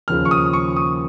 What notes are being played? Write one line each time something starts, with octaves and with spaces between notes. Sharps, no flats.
D#2 C#3 F3 F6
C#6
D#6
C#6
D#6